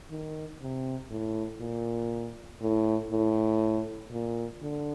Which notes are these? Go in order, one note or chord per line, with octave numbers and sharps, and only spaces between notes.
D#3
C3
A2
A#2
A2
A2
A#2
D3